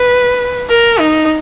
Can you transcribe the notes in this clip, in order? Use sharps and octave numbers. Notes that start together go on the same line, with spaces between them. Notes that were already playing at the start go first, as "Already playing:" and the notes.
Already playing: B4
A#4
D#4